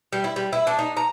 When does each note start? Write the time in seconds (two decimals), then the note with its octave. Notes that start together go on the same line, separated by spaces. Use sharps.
0.12 G3
0.24 E4
0.36 G3
0.53 E4
0.67 D4
0.79 D#4
0.97 A#5